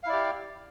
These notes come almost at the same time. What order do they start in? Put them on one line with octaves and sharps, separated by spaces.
F5 E4 D5 G4